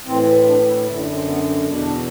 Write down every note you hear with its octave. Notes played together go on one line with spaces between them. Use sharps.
A2 E3 C4
D4
E4
F#2 D3 E4
D4
C4
B3
E2 B2 D4